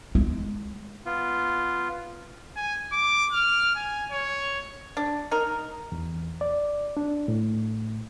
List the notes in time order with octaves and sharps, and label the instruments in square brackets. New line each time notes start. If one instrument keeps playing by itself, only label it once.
[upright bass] G#3
[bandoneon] B3 F4
[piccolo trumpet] G#5
D6
F6
G#5
C#5
[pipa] D4
D#4 A#4
[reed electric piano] E2
D5
D4
A2